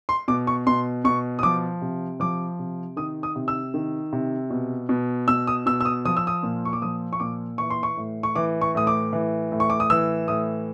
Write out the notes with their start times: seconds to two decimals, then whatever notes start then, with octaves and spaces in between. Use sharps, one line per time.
0.09 C6
0.28 B2 D6
0.47 C#6
0.67 B2 C6
1.04 B2 C#6
1.39 D#6
1.43 F3 D6
1.82 C3
2.20 F3 D6
2.59 C3
2.97 D#3 D#6
3.23 D#6
3.36 C3
3.48 E6
3.74 D#3
4.13 C3
4.50 B2
4.89 B2
5.28 B2 E6
5.47 D#6
5.66 B2 E6
5.81 E6
5.85 D#6
6.05 F3 D#6
6.17 E6
6.27 D#6
6.43 A#2
6.65 C#6
6.73 D6
6.82 F3 D#6
7.13 C#6
7.20 A#2 D6
7.58 E3 C#6
7.70 C6
7.83 C#6
7.97 A2
8.23 C#6
8.35 E3 D6
8.61 C#6
8.75 A2 D#6
8.87 D6
9.13 E3
9.52 A2
9.60 C#6
9.70 D6
9.80 D#6
9.90 E3 E6
10.28 A2 D#6